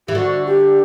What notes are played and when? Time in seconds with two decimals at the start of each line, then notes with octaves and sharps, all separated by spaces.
0.07 E3 G4
0.15 D3 F#4
0.46 G4